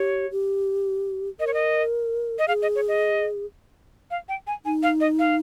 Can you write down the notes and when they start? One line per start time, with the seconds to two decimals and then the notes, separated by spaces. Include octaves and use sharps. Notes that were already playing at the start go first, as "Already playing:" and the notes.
Already playing: G4 C#5
0.31 G4
1.40 A#4 D#5
1.47 C#5
1.54 D#5
2.39 D#5
2.48 G#4 F5
2.62 D#5
2.75 C#5
2.88 D#5
4.11 F5
4.29 G5
4.47 G#5
4.65 D#4 G#5
4.83 F5
5.01 D#5
5.19 F5